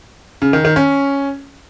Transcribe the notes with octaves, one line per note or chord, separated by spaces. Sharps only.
C#3
D#3
D#3
C#4